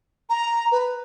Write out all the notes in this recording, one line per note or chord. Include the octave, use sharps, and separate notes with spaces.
A#5
B4